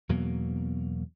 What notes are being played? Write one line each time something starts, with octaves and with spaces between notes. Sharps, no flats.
E2 B2 F#3 A#3